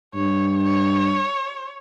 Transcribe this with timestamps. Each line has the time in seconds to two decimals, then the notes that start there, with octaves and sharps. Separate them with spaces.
0.14 G2 C#5
0.64 C#5